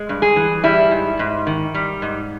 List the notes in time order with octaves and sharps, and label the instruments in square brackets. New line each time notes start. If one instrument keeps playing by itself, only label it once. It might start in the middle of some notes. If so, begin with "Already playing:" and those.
Already playing: [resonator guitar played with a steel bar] G#3
G2
G#4
E3
G3 E4
G#2
G#2
D#3
G3
G#2